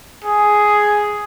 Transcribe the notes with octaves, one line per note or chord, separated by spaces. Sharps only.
G#4